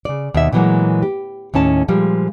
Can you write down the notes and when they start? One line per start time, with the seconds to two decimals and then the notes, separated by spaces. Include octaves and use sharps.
0.05 C#3 D5
0.34 D#2 B2 E5
0.52 A#2 D3 E3 F#3 G#3 A#3
1.02 G4
1.54 D#2 A2 C#4 A5
1.88 A#2 F3 G3 G#3